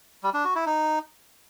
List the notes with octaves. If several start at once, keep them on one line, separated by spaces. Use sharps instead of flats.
G3
D4
F#4
E4
D#4